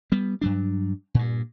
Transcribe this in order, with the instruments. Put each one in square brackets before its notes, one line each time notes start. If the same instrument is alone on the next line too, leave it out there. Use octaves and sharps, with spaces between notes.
[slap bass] G3 B3
G2 F#3 D4
G2 A#2